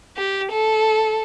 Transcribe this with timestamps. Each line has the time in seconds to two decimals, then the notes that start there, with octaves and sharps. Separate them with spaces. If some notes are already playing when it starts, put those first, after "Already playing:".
0.17 G4
0.51 A4